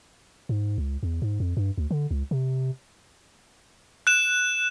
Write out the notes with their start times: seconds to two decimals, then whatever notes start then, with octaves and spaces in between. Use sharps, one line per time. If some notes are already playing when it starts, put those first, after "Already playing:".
0.49 G#2
0.78 C#2
1.03 E2
1.22 G#2
1.40 F2
1.57 G2
1.78 D2
1.91 D3
2.11 C#2
2.31 C3
4.07 F#6 E7